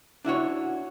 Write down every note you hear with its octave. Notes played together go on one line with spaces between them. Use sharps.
D4 E4 F#4 C#5